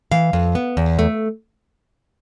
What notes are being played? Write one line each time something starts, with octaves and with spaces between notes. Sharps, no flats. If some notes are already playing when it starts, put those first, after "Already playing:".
E3 F5
F2
B3
E2
A3